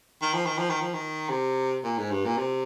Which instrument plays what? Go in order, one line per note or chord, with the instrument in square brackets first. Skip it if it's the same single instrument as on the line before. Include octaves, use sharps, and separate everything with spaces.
[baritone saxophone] D#3
F3
D#3
F3
D#3
F3
D#3
C3
A#2
G#2
G2
A#2
C3